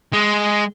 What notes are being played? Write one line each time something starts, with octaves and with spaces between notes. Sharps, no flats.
G#3